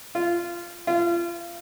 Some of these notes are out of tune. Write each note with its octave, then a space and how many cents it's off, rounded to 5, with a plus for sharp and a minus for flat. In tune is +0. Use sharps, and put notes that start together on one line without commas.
F4 -15
F4 -30